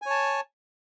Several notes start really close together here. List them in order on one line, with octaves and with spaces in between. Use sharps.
G#5 C#5 A5